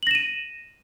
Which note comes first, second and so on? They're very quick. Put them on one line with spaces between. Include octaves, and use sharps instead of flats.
F#7 A#6 E7 D#7